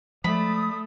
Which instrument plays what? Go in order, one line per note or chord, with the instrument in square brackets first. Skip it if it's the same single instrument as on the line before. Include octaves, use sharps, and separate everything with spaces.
[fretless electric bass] F3 G#3 [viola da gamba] A3 [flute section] D5 E5 D#6 [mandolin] B5